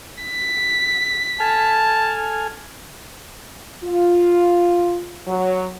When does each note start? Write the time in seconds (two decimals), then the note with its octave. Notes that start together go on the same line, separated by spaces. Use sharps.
0.24 B6
1.40 A4 G#5 A5 F6
3.84 F4
5.26 F#3